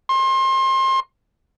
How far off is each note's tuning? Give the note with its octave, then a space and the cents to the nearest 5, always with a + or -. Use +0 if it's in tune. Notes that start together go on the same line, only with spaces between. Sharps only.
C6 +30